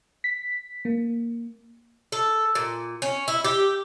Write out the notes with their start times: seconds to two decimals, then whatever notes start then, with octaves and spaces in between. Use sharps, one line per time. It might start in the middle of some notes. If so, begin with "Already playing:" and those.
0.24 B6
0.85 A#3
2.12 A4
2.55 A#2
3.02 C#4
3.28 E4
3.44 G4